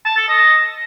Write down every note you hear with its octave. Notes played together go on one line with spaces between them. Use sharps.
A5
A4
D#5